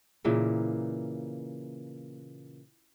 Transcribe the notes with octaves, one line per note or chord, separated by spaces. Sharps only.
A#2 C#3 E3 A#3